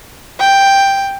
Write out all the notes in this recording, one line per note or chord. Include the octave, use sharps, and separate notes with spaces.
G5